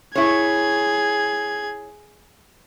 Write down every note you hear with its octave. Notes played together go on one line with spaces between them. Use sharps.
E4 G#4 C#5 G#6